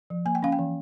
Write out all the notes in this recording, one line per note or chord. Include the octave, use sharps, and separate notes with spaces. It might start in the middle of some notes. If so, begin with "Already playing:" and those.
F3
A#3 G#5
G5
C#4 F5
G5
E3